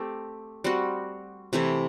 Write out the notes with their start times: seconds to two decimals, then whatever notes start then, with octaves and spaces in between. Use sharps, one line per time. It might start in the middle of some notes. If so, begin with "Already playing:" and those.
Already playing: A3 C4 G4
0.64 G3 C4 F#4
1.53 C3 E3 A3 E4